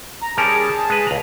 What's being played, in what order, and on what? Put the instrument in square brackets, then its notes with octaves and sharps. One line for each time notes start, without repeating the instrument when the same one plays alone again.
[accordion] A#5
[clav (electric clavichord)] G3 C#4 A#4 [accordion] G#4 A5
[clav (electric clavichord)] G#3 B4
C#2 A#5